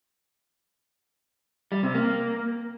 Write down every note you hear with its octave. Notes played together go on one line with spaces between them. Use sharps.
G3
C3
A#3